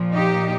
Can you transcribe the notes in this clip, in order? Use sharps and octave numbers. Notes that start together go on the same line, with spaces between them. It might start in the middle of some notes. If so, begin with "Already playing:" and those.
Already playing: A#2 F3
D#4 G4